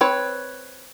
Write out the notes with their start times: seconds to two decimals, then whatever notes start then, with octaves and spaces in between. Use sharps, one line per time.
0.01 C4 B4 C#5